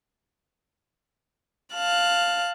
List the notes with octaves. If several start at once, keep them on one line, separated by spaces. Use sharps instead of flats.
F5 A5 F#6